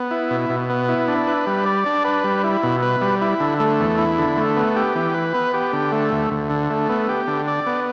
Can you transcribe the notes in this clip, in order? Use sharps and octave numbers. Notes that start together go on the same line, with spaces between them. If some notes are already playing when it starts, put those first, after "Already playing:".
Already playing: B3
E4
B2
B2
B3
E4
D4
B4
G3
D5
D4
B4
G3
E4
B2
B4
G3
E4
D3
A3
E2
E4
D3
A3
B3
G4
E3
B4
B3
G4
D3
A3
D2
D2
D3
A3
B3
G4
D3
D5
B3